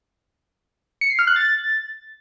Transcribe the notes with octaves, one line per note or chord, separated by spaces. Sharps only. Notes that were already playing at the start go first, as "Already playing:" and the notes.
C#7
C7
F6
F#6
A6